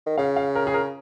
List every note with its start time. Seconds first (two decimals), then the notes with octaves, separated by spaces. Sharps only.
0.06 D#3
0.18 C#3 F5
0.36 F5
0.55 A#4
0.67 G#4
0.74 A#4